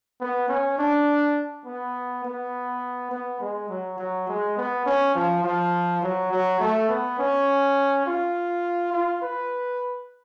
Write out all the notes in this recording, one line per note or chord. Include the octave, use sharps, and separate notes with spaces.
B3
C#4
D4
B3
B3
B3
G#3
F#3
F#3
G#3
B3
C#4
F3
F3
F#3
F#3
A3
B3
C#4
F4
F4
B4